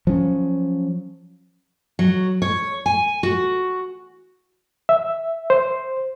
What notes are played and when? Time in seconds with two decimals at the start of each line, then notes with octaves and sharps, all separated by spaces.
0.07 F3 F#3 C#4
1.99 F#3
2.42 C#5
2.86 G#5
3.23 F#4
4.89 E5
5.50 C5